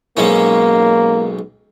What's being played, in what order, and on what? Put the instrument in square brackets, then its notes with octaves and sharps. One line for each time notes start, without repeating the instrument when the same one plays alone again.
[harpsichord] B1 G#2 C#4 [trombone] A#3